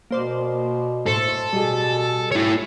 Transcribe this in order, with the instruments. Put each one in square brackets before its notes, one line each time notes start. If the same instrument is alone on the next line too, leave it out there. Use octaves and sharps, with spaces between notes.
[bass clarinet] B2 [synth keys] A#3 C5 D5
[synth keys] A2 C5 [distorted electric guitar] A4
[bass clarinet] B2 [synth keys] G3 G#4
[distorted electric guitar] E4 C#5